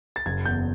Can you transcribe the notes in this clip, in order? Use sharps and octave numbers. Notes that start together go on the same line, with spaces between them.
A6
F#1 G#6
E2 G6